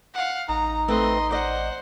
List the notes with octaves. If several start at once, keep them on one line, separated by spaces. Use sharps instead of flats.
F5 F#5
A1 D#4 A#5
A3 C4 B4 D#5 C6
C5 D5 D#5 F#5